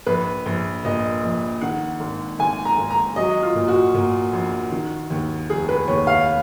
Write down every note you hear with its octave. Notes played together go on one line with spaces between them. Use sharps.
A#1 B4
A#1
A#2 D#5
A#1
D#3 F#5
G#1
G#1 G#5
A#5
G#1
A#5
F#3 D#5
F4
A#2
F#4
A#2
A#1
D#3
D#2
F1 G#4
B4
D#2 C#5
F5